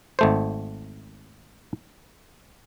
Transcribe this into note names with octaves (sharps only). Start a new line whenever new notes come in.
G#1 A3 C5